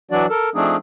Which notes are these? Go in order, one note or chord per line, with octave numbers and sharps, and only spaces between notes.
E3 F#3 D4 F#4 D5
A4 A#4
F3 A3 C4 D4 D#4 G#4